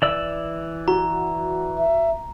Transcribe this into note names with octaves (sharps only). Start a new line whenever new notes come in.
E3 D5 E6
F#4 A#5
E5